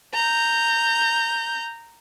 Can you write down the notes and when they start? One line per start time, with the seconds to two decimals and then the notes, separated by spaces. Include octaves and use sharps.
0.14 A#5 G6